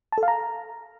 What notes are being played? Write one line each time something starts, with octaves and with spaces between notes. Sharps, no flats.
A5
A4
F5
A#5